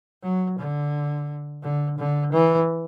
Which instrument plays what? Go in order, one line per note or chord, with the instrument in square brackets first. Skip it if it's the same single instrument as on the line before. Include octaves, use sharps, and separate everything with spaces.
[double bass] F#3
D3
D3
D3
E3